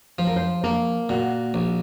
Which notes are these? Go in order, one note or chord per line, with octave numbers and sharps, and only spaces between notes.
F3 C5
A#4
C5
A#3 A#4
A#2 F#4
A#1